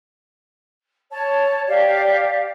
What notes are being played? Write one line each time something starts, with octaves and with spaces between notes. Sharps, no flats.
C#5 A5
G4 D5 F5